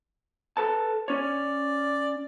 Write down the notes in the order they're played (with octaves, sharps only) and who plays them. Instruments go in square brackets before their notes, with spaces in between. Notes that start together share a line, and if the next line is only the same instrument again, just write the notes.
[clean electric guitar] A4 B4 A5
[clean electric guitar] C#4 C#5 [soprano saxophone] D5